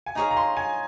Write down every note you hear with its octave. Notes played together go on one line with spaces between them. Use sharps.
G#5
D#4 G#4 C#5 F5 A#5
A#5
C6
G#5